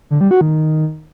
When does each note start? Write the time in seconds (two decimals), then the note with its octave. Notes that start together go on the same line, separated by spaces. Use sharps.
0.11 D3
0.21 G3
0.31 F#4
0.41 D#3